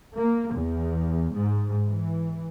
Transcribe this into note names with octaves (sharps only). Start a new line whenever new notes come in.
A#3
E2
G#2
E3